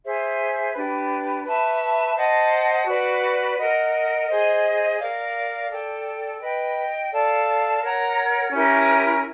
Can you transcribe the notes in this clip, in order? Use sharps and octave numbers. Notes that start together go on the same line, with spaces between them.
G#4 C5 E5 G#5
D4 G4 B4
B4 E5 A5 C#6
C5 D#5 F#5 A5
F#4 B4 D5
A#4 D#5 F#5
G#4 C5 D#5
A#4 D5 F5
A4 D5 G5
B4 D#5 G5
A4 D5 F5 A5
A#4 C#5 F#5 A#5
C#4 E4 G4 A#4